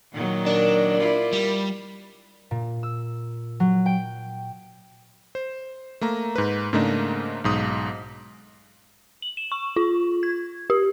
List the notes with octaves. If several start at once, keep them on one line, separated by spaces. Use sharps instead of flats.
A#2 D#3 F#3
D4 A#4 D5
E4 F4
G3
A#2
E6
F#3
G5
C5
A3 A#3 A#5
G#2 B4
G#2 C#3 A3 A#3 D4 D#4
B1 G#2 D#6
F#7
E7
C#6
F4
G#6
G4